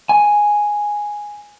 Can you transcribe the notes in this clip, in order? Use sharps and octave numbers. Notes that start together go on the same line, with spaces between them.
G#5